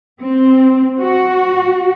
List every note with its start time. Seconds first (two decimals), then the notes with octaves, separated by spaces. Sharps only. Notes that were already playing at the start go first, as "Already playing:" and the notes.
0.21 C4
1.00 F#4